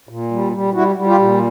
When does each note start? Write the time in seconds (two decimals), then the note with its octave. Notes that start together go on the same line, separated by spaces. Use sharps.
0.09 A#2
0.31 G3
0.52 G3
0.74 G3 E4 F#4
0.96 G3
1.07 F4 G4
1.18 A#2